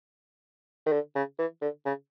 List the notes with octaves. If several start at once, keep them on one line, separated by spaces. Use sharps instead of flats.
D#3
D3
C#3
E3
D3
C#3